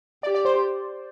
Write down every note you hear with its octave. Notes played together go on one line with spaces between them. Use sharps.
G4 D5
D5
C5